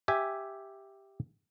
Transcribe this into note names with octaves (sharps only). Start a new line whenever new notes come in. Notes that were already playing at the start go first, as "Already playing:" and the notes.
G4 E5 G#5